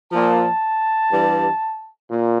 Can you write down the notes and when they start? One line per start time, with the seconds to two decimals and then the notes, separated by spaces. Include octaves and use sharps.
0.10 A#2 F3 A5
1.11 G2 E3 G3
2.10 A#2